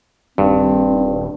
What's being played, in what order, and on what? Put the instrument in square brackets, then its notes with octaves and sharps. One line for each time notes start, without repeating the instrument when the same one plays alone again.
[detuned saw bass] D#1 [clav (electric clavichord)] G2 [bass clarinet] C4